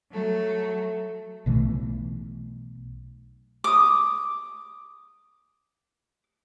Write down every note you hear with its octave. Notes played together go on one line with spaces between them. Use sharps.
F#3 A3
B1 B2 E3 A3
D6 D#6